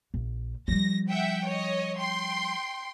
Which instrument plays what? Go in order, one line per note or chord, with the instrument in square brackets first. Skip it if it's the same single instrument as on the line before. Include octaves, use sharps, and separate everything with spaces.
[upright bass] A#1
[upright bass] F3 G3 [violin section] A#6
[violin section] E5 F#5 G5
C#5 D#5
G5 C6